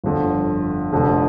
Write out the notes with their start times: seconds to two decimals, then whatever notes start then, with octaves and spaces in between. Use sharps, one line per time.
0.04 G1 F2 D3
0.93 F1 F2 D3